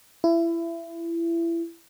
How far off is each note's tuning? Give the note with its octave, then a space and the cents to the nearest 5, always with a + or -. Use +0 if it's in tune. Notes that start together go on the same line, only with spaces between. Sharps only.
E4 +25